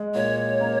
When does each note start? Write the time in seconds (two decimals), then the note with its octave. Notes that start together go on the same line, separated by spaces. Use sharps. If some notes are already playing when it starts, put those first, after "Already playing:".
Already playing: G#3
0.15 A#2 C#5
0.60 A#3